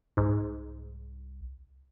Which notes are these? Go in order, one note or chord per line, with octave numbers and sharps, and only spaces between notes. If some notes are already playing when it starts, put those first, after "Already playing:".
C2 G#2